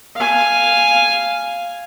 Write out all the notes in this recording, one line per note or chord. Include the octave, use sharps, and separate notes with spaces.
F5 G#5